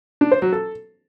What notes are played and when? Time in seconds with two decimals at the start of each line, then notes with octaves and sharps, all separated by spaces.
0.21 D4
0.32 C5
0.42 F#3
0.53 A4